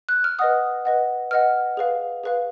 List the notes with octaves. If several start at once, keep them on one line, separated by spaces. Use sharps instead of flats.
F#6
F6
B4 D#5 F#5 D#6
B4 D#5 F#5
B4 D#5 F#5 F6
G#4 B4 F5
G#4 B4 F5